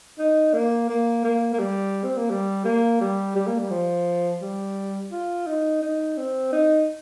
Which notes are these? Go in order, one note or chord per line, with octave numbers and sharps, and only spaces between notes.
D#4
A#3
A#3
A#3
A#3
G3
C4
A#3
G3
A#3
G3
G3
A#3
G3
F3
G3
F4
D#4
D#4
C4
D#4